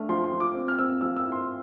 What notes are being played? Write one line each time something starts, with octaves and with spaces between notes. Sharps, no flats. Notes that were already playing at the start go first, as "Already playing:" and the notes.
Already playing: A3 D4 F6
F3 C6
C6
F3
D6
C4
F6
C4 E6
F3 E6
E6
E4
C6